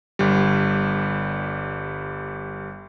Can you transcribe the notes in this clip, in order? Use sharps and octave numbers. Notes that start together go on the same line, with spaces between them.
G1 G3